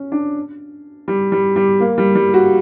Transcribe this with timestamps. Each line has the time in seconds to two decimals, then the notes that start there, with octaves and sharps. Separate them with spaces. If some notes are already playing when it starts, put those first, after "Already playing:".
Already playing: C#4
0.12 D4
1.08 G3
1.32 G3
1.56 G3
1.80 A#3
1.98 G3
2.15 G3
2.34 F#4